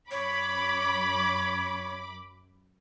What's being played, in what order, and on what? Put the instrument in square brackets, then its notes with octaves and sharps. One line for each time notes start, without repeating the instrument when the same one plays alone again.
[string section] F#2 B5 D6 [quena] C#5